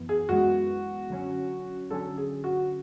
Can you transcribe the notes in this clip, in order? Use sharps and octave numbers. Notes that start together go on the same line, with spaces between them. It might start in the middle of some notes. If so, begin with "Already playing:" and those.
Already playing: F#2 E3 B3
G#4
F#2 E3 G#3 B3 F#4
D3 F#3 C#4
D3 F#3 C#4 A4
G#4
F#4